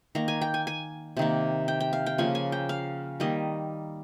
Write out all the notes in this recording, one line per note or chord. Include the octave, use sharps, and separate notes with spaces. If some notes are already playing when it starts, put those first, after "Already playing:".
D#3 A#3 A#5
G#5
G5
G#5
G#5
C3 D#3 A#3
G5
G5
F5
G5
C#3 F3 A#3 G#5
G#5
G5
F5
D#3 G3 A#3 D#5